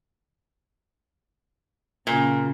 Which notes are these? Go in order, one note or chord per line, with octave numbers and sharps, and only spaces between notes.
A#2 C#3